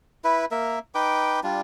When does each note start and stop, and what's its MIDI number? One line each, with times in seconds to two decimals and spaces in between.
0.24 0.45 64
0.24 0.45 71
0.51 0.79 58
0.51 0.79 70
0.51 0.79 76
0.95 1.40 63
0.95 1.40 71
0.95 1.40 79
0.95 1.40 86
1.43 1.61 55
1.43 1.61 62
1.43 1.61 65